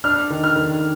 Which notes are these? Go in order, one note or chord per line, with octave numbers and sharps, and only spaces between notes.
D4 F6
D#3
F6
D#3